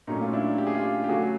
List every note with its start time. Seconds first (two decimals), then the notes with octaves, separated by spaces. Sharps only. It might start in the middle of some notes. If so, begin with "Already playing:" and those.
0.07 A#2 F#3 A3 C#4 D#4
0.21 F4
0.33 D4 E4
0.58 G4
0.67 G#4
0.75 F4 G4
1.04 G4
1.09 C#3 F#3 A3 F#4 G#4